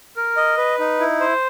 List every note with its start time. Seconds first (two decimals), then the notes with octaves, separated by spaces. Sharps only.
0.17 A#4
0.37 D#5
0.58 B4
0.79 D#4
1.00 E4
1.20 C5